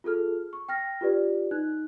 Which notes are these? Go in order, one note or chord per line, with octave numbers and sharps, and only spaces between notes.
F4 G#4 A4 F6
C#6
G5 F6 A#6
F4 G4 B4 D5
D#4 F#6